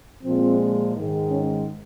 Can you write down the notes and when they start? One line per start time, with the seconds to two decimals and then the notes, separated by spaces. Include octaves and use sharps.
0.23 A#2 F3 G#3 C4
0.95 G#2 D#3 G#3
1.30 C#4